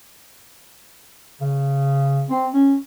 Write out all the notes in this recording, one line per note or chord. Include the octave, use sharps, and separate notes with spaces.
C#3
C4
C#4